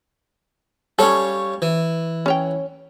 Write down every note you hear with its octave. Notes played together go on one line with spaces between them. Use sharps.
G3 C#4 A4 C#5 F5
E3
C#4 C#5 G5